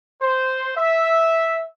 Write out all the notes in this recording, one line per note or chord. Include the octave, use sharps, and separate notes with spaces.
C5
E5